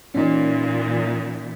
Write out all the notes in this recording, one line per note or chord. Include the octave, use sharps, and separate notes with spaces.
A#2 E3 C#4 D#4